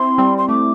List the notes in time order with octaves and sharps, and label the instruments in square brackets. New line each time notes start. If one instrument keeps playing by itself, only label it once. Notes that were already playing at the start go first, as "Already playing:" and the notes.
Already playing: [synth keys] C4 E4 [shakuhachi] C6
[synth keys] G3 C4
[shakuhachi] C6
[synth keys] A3 [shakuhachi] D6